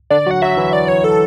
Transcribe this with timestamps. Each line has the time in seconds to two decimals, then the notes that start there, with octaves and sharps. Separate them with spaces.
0.10 D3 D4 D5
0.26 F#3 F#4
0.31 F#5
0.42 F#3 F#4 E5
0.57 E3 E4
0.73 D5
0.88 C#5
1.04 A4